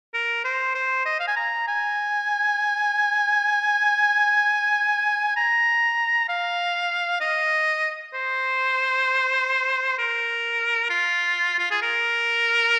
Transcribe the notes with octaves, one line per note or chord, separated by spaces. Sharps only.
A#4
C5
C5
D#5
F5
G#5
A#5
G#5
A#5
F5
D#5
C5
A#4
F4
F4
G#4
A#4